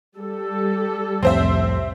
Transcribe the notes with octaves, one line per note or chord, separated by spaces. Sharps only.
G3 A4
C2 F2 A2 C4 C5 E5